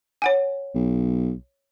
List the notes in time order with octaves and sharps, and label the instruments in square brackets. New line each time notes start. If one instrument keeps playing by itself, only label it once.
[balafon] C#5 F#5 G#5
[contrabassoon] B1